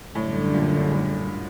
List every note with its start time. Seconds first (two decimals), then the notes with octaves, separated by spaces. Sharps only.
0.15 F#2 A2 D3 G3
0.54 A#2
0.83 G#2
0.92 A2